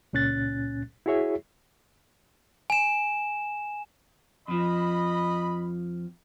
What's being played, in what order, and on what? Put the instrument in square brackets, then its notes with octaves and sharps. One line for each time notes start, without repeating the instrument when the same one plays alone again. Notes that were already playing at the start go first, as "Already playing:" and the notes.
[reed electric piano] C#2 A#2 C#4 F#6 A6
E4 F#4 G#4 C#5 E5
[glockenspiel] G#5 E7
[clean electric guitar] F2 F3 [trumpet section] D#5 B5